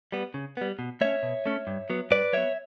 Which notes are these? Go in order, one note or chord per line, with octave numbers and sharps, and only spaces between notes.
G3 B3
C#3
G3 B3
B2
A3 C#4 C#5 E5
B2
A3 C#4
G2
F#3 B3
G2 B4 D5
F#3 B3 C#5 E5